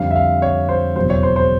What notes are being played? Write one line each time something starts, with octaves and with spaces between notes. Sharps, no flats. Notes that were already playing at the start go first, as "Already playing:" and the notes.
Already playing: F2 D3 G3 F5
E5
F5
C#5
C5
E1 E2 C#3 F#3 C5
C#5
C5
C5